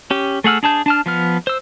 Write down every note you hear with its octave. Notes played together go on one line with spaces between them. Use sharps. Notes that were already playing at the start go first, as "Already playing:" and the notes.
C#4 G4
A3 G#4 F#5 E6 F6
D4 G#4 A5 G6
D4 A5 F6
F3 B3 F6
C5 E6